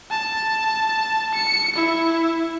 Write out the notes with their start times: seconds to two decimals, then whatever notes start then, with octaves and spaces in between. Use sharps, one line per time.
0.11 A5
1.34 C#7
1.76 E4